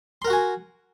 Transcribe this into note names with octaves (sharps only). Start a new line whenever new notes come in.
F#4 A#4 F#5 G#5 C6